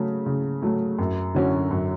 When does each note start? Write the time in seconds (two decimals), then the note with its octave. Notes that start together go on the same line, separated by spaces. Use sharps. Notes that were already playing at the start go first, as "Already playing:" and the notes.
Already playing: C#3 F#3 A3
0.26 C#3
0.62 F#3 A3
0.98 F#2
1.35 D3 F#3 C#4 F#4
1.71 F#2